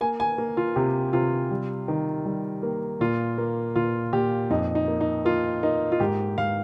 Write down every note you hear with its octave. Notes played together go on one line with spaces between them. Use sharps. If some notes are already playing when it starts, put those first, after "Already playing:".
A#3 G#5
G#5
A#3
F4
C3 G4
C3 F4
G3
D#3
G3
A#3
A#2 F4
A#3
A#2 F4
A#2 G4
F2 D#4
D#4
A#3
D#4
A#3 F4
A#3 D#4
F4
G#2 G4
G#2 F5